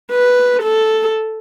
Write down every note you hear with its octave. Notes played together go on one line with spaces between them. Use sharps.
B4
A4